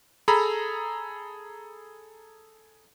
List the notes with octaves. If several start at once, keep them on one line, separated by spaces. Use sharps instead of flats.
G#4 A4 A#5 B5